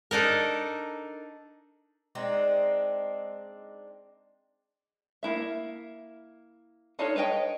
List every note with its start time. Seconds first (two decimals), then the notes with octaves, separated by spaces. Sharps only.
0.11 D4 D#4 A4 A#4
2.15 G#3 C4 D4 D#4
5.23 A#3 E4 E5
6.99 D4 D#4 F4 A4 C#5
7.16 B4 C#5 D#5 G5